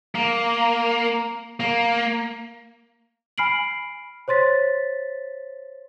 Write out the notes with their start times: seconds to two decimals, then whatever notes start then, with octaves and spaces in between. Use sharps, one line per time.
0.15 A#3
1.60 A#3
3.38 G#5 B5 F6 C7 D7 F#7
4.28 C5 C#5 C6 A6 B6